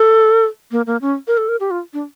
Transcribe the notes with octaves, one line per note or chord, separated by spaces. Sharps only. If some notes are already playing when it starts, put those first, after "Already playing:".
Already playing: A4
A#3
A#3
C#4
A#4
A4
A#4
G4
F4
D4